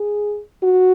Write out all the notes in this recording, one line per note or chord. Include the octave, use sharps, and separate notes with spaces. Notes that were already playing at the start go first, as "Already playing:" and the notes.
Already playing: G#4
F#4